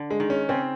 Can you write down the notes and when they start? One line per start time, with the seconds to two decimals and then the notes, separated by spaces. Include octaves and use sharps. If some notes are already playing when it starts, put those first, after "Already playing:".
Already playing: D3
0.10 G#3
0.20 D#3
0.30 C#4
0.49 C#3 C4